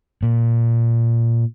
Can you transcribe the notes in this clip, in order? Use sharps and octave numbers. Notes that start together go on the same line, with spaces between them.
A#2